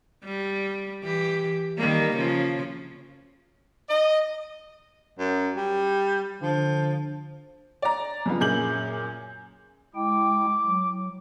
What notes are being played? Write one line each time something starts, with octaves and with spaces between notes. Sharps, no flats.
G3
E3 G4
D#3 G3 A#3
C#3 F3
D#5
F#2
G3
D3 F3
D5 A#5
F2 C#3 B3 F4
F#2 A#2 G#4 G6 F#7
G#3 E4 G5 D6
F#3